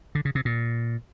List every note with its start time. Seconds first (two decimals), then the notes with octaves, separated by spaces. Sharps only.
0.15 D3
0.25 C#3
0.35 C3
0.45 A#2